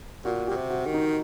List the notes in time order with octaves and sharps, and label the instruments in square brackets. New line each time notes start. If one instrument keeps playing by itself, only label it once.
[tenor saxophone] A#2 [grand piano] F#4
[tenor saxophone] A#2 [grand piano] G4
[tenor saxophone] C3
[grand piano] F#4
[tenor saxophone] D#3
[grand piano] D#4